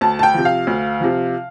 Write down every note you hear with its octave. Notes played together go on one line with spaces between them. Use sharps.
D2 A5
A5
G5
C3 F3
F5
D2
C3 F3